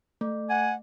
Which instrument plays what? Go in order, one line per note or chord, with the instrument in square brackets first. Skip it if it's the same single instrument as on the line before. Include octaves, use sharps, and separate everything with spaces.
[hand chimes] A3
[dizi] F#5 [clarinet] G#5